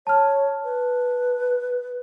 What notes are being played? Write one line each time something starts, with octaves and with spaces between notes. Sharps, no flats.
C#5 A5 F6
B4